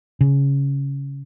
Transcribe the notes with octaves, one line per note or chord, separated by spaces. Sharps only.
C#3